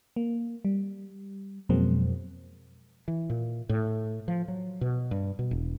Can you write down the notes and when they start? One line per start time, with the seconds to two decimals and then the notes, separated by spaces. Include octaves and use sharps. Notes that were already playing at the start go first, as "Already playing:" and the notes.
0.16 A#3
0.65 G3
1.69 F2 B2 F#3 G#3 A#3 C4
3.08 E3
3.30 A#2
3.69 A2
4.28 F3
4.48 F#3
4.81 B2
5.11 G2
5.39 B2
5.51 E1